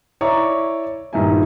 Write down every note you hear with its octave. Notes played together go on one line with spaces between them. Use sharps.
E4 C#5 D5 A#5 C#6 D6
G2 A#2 D#3 D#4 E4 G#5